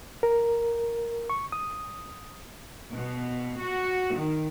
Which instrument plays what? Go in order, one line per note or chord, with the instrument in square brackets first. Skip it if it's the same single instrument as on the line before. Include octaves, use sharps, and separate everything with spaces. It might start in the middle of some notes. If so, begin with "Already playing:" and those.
[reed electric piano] A#4
C#6
D#6
[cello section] B2
F#4
D#3